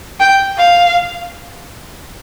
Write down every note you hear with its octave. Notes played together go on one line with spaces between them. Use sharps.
G5
F5